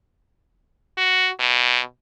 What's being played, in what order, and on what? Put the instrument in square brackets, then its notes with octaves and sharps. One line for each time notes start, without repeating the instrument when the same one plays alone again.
[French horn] F#4
B2